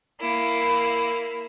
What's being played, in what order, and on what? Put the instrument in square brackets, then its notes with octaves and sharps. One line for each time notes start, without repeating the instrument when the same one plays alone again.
[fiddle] A#3 E4